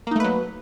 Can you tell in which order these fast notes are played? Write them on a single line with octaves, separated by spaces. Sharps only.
A#3 D#4 A3 B4 F#3